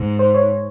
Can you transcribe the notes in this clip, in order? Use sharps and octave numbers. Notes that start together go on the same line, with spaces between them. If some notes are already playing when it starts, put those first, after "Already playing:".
Already playing: G#2
C5
C#5